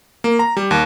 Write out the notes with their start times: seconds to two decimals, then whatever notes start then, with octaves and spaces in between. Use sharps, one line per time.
0.24 A#3
0.39 A#5
0.57 G3
0.71 D#2